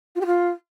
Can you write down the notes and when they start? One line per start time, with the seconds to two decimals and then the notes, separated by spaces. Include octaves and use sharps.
0.15 F4
0.21 G4
0.26 F4